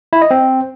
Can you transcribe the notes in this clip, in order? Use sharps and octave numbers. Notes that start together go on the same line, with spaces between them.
E4
D#5
C4